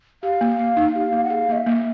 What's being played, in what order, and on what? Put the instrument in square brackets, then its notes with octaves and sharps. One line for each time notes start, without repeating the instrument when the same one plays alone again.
[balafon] G4 [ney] F5
[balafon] A#3
A#3
D#4
G4
A#3
[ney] F#5
[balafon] G#4 [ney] F5
[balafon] A#3 [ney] D#5
[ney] E5
[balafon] A#3